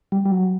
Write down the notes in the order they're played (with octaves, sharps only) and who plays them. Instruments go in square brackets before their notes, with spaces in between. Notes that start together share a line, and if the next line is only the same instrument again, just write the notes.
[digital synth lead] G3
G3
F#3